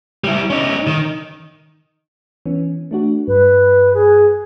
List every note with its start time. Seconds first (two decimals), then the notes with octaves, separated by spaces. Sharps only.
0.24 G3 E4
0.50 C#4 D#4
0.87 D#3
2.46 E3 B3 C#4
2.91 A3 D4 F#4
3.27 G2 B4
3.94 G#4